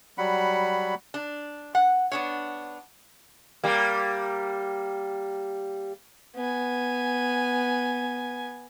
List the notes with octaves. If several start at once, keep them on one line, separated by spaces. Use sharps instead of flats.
F#3 G3 F#5 B5
D4
F#5
B3 D4 C#5
G3 A#3
B3 G#5